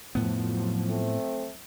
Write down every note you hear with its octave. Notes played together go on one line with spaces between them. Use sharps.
F2 A2 F3 F#3 B3
A3 C4